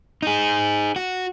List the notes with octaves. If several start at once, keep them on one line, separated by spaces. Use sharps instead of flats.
D#4 G#4
F#4